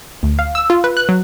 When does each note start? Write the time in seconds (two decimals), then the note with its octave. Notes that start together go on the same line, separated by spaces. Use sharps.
0.23 D2
0.39 F5
0.55 E6
0.70 F4
0.84 B4
0.97 F#6
1.09 F#3